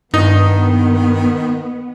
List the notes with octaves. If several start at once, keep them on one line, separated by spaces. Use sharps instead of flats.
G2 D#3 B3 D#4